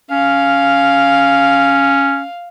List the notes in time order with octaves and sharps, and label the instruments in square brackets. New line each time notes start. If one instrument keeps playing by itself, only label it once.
[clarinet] C#4 [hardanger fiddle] F5